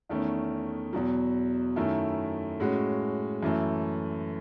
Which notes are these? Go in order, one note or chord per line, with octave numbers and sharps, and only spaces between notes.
E2 D#3 A3 C#4
E2 B2 F#3
F#2 D#3 A3 E4
A2 G#3 C#4 F#4
F#2 E3 A3